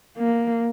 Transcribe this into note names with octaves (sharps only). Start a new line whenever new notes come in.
A#3